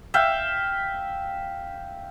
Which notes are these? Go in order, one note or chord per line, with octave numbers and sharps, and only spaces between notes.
E5 F5 G5